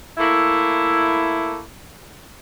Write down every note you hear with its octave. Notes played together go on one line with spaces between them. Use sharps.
A3 A#3 E4